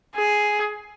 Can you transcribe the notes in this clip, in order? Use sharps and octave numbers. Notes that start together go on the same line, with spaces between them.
G#4